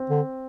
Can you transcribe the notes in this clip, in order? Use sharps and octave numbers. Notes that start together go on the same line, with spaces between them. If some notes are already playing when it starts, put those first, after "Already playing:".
Already playing: C4
D3